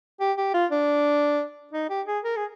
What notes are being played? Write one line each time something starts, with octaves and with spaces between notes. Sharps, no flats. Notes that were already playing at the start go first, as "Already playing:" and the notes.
G4
G4
F4
D4
D#4
G4
G#4
A#4
G#4